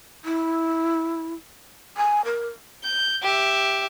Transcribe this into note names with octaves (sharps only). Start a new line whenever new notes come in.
E4
G#5
A#4
G6
G4 E5